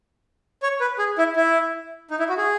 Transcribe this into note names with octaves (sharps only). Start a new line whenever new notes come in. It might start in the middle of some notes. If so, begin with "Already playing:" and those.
C#5
B4
G#4
E4
E4
D#4
E4
F#4
G#4